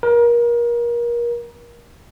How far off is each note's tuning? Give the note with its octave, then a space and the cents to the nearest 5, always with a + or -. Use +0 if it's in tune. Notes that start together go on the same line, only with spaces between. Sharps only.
A#4 +30